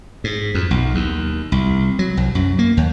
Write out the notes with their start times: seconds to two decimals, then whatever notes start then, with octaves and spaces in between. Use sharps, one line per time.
0.24 G#2
0.55 F2
0.71 B1
0.95 D#2
1.52 C2
1.99 F#3
2.17 C2
2.35 F#2
2.59 A#3
2.77 D#2